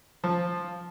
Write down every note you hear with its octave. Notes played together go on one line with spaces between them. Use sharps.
F3